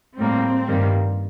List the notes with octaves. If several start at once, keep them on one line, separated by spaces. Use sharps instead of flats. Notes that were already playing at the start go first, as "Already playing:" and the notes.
A2 G3 A#3 C4
G2 D#3 G3 A#3